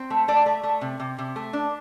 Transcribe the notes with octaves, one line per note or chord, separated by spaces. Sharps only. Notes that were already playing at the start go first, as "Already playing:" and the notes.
Already playing: C4 C5
A3
A3 D5
A3
A3
C3
C3
C3
A3
D4